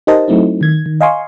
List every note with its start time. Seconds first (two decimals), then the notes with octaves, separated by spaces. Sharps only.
0.07 D#4 G4 A#4 C5 D#5 A5
0.28 F#3 A3 C4 D#4 E4
0.61 D#3 G#6
0.86 D#3
1.01 D#5 F5 G#5 C6 C#6